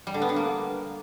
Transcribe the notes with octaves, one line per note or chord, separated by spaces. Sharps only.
G3
D3
B3
D3
A#3